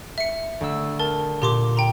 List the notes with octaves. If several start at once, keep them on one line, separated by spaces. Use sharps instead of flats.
E5 C#7
D2 E6
A#4 A5
A#2 G4 C6 D6
G5 A#5 C6